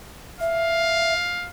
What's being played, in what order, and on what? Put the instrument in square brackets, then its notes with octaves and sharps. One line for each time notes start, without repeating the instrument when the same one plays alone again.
[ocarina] E5 [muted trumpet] F5